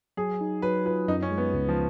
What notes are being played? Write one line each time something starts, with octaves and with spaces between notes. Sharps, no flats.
F#3 G#4
D#4
F#3 B4
F4 B4
F#2 D#4
C#4
G#3
B3
C#2
F3